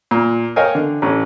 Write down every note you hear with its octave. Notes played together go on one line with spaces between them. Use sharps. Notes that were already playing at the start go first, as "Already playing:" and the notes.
A#2
A#4 C#5 D#5 F5 G5 G#5
D3
A1 C#4